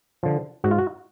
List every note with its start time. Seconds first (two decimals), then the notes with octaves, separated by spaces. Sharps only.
0.23 D3 F3
0.64 G#2 F#4
0.71 F4
0.79 F#4